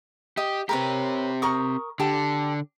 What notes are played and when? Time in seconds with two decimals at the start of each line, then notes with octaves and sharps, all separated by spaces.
0.37 G4 D#5
0.69 C4 G4 A#4 B4 C#5
1.42 A#4 C#6 D#6
2.00 D3 G4 A5